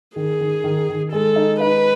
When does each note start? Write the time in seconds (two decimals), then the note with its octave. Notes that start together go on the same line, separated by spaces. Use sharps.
0.16 D#3 G#4
0.40 D#3
0.64 D#3
0.89 D#3
1.12 G#3 A4
1.36 D#4
1.60 D#4 B4